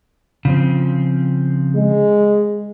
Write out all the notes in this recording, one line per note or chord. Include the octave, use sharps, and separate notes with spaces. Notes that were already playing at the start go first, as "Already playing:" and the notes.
C#3 F3 C4
G#3